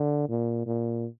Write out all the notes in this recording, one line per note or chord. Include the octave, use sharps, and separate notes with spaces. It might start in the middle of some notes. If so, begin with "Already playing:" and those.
Already playing: D3
A#2
A#2